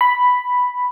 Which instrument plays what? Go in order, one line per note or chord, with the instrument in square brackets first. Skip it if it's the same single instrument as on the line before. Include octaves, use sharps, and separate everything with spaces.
[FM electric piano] B5